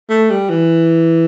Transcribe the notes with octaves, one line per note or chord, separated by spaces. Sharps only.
A3
G3
E3